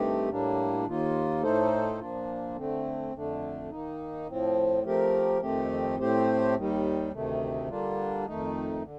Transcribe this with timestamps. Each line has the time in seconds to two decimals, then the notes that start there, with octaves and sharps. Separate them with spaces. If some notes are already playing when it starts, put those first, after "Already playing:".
Already playing: G2 D#3 A3 C4 G4
0.28 A2 G3 A#3 D4
0.86 D#2 D#3 A#3 F4
1.43 A2 A3 D#4 A4 C5
1.99 A#2 F3 A#3 D4 F4
2.56 D3 A3 C4
3.13 F2 D3 A3 D4
3.71 D#3 A#3 D#4
4.27 A2 F3 C4
4.84 F3 A3 C4 G4 A#4
5.41 F2 D#3 A3 C4 G4
5.98 A2 A3 C4 G4 C5
6.55 D#2 D#3 G3
7.11 D2 C3 D#3 A3
7.68 D3 G3 A#3 D4 F4
8.26 F2 D#3 A3 D#4
8.82 D3